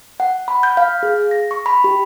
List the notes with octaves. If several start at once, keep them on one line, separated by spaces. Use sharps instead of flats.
F#5
B5
G6
F5
G#4
A#6
C#6
B5
G4